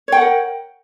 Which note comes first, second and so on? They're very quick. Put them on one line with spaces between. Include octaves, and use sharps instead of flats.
C#5 G5 F#5 A#4